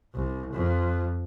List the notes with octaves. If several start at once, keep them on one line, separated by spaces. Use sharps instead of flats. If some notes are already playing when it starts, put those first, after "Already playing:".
C2
F2